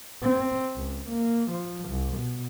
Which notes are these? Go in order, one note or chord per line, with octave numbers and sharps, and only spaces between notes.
C4
C#2
A#3
F3
C2
B2